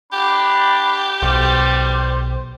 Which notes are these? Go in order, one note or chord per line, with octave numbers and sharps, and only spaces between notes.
D4 G4 B5
B1 G3 C5